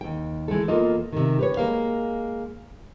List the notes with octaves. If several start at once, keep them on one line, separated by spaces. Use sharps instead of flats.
D#2 G5
E3 G#3 A3 A4
E2 A#3 F4 A4 D#5
C3 D#3
G4 B4 C#5
G#3 A#3 F5